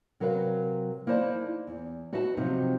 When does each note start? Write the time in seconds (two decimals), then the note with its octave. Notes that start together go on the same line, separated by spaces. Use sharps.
0.20 C3 F#3 A#4 B4 F5
1.07 A#3 D#4 E4 C5 D5 A5
1.67 E2
2.13 D#4 F#4 B4 E5 F#5 A5
2.37 C3 F3 F#3 C4 D#4 G4